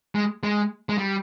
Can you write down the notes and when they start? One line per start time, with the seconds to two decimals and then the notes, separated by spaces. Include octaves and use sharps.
0.15 G#3
0.43 G#3
0.89 G#3
0.98 G3